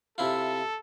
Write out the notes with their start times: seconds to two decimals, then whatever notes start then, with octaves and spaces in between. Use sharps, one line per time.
0.18 C3 E4 F4 A4